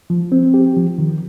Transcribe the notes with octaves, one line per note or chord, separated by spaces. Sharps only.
F3
C4
G4
F3
D#3